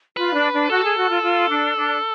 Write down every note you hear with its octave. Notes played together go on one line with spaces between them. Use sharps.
F4 B4
D4
D4
F#4 A4
G#4
F#4
F4
F4
D4
D4